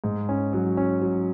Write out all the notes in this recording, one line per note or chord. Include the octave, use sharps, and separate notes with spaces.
G#2
C#4
F#3
C#4
F#3